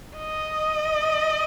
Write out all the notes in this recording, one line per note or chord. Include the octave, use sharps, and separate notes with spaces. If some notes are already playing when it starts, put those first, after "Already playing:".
D#5